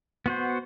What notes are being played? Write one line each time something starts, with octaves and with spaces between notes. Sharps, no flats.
B3 F#4 C5